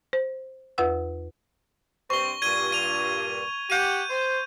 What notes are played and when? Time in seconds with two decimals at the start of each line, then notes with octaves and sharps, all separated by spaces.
0.13 C5
0.78 E2 F4 B4 F#5 E6
2.10 G2 C4 C#6 G7
2.42 G2 A#2 G#6 D#7 G7
2.72 D#7 F7
3.70 G4 F#5 G6 D#7
4.09 C5